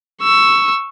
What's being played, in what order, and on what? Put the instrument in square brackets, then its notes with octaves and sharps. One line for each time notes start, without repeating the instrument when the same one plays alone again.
[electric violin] C#6 E6